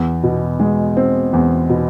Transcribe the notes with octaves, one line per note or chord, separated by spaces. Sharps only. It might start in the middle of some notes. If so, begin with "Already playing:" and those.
Already playing: E2
B2
G#3
C4
E2
B2